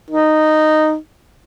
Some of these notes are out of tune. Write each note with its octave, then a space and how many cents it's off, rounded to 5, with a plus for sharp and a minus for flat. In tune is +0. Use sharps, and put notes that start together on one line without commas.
D#4 -10